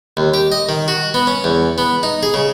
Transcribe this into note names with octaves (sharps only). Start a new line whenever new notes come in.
D#2
G4
D#5
D#3
F#4
B3
C#4
E2
B3
D#4
G#4
C#3